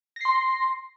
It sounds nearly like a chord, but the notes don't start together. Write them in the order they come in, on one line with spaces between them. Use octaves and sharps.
A#6 C7 C6